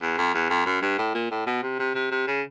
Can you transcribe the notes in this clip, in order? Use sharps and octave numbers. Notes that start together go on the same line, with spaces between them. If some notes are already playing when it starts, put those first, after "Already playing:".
E2
F2
E2
F2
F#2
G2
A2
A#2
A2
B2
C3
C3
C3
C3
C#3